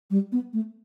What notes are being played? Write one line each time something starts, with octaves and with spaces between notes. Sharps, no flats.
G3
B3
A3